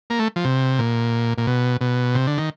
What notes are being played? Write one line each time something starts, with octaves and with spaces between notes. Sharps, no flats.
A#3
A3
F3
C3
A#2
A#2
B2
B2
C3
D3
D#3